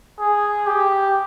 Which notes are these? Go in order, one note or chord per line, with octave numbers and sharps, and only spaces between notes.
G#4
G4